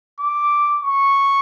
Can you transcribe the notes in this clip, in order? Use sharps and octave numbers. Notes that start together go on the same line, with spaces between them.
D6
C#6